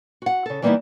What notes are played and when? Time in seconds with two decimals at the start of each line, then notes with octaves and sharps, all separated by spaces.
0.22 F#4 F#5
0.46 C#3 A4
0.62 E3 G3 A#3 B3 D#4 E4